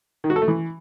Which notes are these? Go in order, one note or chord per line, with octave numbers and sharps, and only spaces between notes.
D#3
F#4
A4
A3
E3